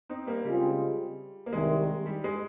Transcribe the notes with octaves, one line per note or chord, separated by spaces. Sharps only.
C4 D#4
G3 A#3
C#3 G3 G#3 C4 F4 G#4
A#3
C2 C3 D#3 G#3
G3
G#3